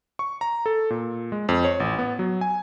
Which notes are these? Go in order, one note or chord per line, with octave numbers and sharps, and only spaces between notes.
C#6
A#5
A4
A#2
G#3
F2
C#5
A1
B3
F#3
G#5